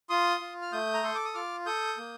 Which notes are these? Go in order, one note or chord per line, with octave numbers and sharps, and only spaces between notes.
F4 C6 D#6
F4
F6
A3 D#6 G6
A#5
A4 C6
D6
D#6
F4 D6 F6
A4 D#6 G6
A#3